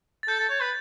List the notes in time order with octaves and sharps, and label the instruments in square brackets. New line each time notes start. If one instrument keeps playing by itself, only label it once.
[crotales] A6
[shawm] A4 [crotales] G6
[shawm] A4
C#5
B4